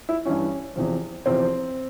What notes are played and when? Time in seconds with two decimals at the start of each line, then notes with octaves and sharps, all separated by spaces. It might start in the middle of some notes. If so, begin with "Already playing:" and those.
0.09 E4
0.25 G2 E3 C#4
0.76 E2 C3 F3
1.26 E2 C3 F3 C4